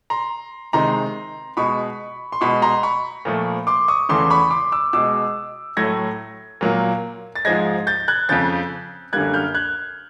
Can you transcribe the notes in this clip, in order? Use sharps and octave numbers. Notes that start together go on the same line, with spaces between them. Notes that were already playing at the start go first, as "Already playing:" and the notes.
A#5 C6
C3 D#3 G#3 A#5 C6
B2 G#3 B5 C#6
C6
B2 G#3 B5 C#6
A#5 C6
B5 C#6
A#2 F3 A3
C6 D6
C#6 D#6
E2 C#3 E3 A3 C6 D6
B5 C#6
C6 D6
D6 E6
B2 G#3 D6 E6
A2 F#3 A3 G#6 A#6
A#2 F#3 A#3
A6
G#2 F3 G#3 G#6 A#6
G6 A6
F#6 G#6
F2 C#3 F3 G6 A6
F#2 D3 G3 A#3 F#6 G#6
F6 G6
F#6 G#6